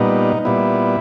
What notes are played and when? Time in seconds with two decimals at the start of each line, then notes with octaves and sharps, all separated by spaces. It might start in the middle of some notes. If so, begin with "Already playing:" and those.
Already playing: A#2 G3 B3 D#4
0.45 A#2 G3 B3 E4